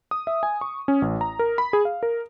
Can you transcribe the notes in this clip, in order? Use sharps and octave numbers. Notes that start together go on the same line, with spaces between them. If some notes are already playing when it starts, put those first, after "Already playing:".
D#6
E5
G#5
C#6
C#4
A1
A#5
A#4
B5
G#4
F5
A#4